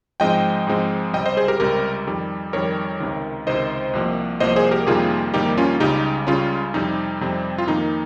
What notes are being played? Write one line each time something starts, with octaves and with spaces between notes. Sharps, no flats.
G#2 F3 G#3 C4 D#5 G5
G#2 F3 G#3 C4
C#2 C3 G3 C4 D#5 G5
C5 D#5
G#4 C5
G4 A#4
C#2 C3 G3 C4 G4 A#4
F2 D#3 G3
F2 D#3 G3 A#4 C#5
C#2 C3 D#3
C#2 C3 D#3 C5 D#5
C2 C3 F3 A#3
C2 C3 F3 A#3 C5 D#5
G#4 C5
G4 A#4
F2 C3 D#3 G3 A#3 F4 G#4
F2 C3 D#3 G3 A#3 D#4 G4
C#4 F4
C#2 C#3 G3 D#4 G4
C#2 C#3 G3 C#4 F4
F2 C3 G3 C4 D#4
F2 C3 G3 C4
F4
F2 D#3 A#3 D#4